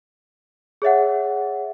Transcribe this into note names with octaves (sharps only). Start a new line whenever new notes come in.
G#4 C#5 E5 F#5